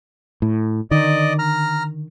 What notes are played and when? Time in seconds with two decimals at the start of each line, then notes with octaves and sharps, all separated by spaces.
0.42 A2
0.91 D3 D#3 D5 D#5
1.39 A#5 F6